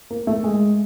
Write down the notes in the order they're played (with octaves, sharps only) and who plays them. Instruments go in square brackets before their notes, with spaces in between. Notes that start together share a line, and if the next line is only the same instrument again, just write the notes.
[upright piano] A#3
A3
G#3